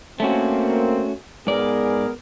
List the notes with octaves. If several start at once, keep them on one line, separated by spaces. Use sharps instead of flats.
A3 A#3 C4 C#4 F#4
G#2 B3 G#4 A#4 D5